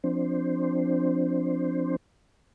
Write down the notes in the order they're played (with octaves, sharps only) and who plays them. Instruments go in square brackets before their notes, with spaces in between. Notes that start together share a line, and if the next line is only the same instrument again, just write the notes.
[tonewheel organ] F3 C4 D4 C5